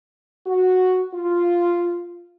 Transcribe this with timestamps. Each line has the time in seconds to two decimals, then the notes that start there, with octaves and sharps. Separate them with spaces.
0.47 F#4
1.14 F4